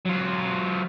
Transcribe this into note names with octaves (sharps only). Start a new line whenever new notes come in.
F#3 F4